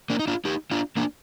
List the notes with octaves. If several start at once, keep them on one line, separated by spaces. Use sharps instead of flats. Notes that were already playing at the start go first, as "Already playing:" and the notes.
A#3 D4
D#4
D4 F4
D#4 G4
D4 F4
A#3 D4